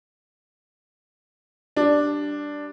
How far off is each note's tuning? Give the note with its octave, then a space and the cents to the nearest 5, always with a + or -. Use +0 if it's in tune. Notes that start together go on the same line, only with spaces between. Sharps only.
G3 -10 D4 +0